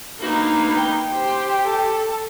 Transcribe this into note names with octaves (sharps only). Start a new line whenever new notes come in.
A#3 D4 D#4 F#4 B4
G5
G4 C5
A4